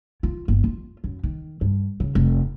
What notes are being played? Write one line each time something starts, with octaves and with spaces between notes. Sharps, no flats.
F4
G1
F4
F#2
D#3
G2
C#3
F1